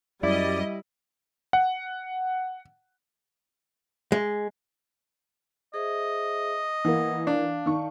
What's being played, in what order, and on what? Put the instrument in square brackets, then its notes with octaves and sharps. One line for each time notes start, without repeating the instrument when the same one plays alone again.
[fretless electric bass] F#2 [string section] G3 D#5 [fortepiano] E4 [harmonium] D5
[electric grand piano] F#5
[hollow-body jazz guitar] G#3
[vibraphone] G#4 C5 E5 [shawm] D#5
[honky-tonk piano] E3 A#3 [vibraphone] F#5
[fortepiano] D4 [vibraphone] D5 F5 A5
[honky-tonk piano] D#3 C#6